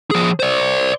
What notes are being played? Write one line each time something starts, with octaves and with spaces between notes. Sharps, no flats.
F3 G#4
C5 D5